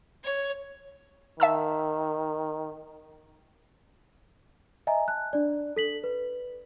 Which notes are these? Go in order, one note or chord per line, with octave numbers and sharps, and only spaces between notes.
C#5
D#3 E5 A5 E6
D#5 E5 G#5 A#5
A5 F#6
D4 D5
A4 B6 F#7
B4